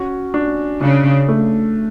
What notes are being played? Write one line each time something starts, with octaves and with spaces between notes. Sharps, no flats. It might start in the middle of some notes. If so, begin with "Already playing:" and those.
Already playing: C#4 F#4
D4
C#3 D4
A3